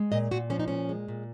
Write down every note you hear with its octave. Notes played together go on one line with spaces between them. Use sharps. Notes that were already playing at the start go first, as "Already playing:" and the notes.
Already playing: G#3
A#2 D#5
A#2 F#4
F3 C#4
D#4
A#2 C#4
G#3
A#2